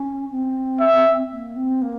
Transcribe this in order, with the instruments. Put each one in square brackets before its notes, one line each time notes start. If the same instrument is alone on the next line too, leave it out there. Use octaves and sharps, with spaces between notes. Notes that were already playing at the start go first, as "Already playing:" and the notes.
Already playing: [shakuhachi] C#4
C4
[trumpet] E5
[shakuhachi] A#3
C4
A#3